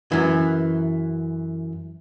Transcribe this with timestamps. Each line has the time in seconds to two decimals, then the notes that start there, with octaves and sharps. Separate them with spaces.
0.12 F#2 E3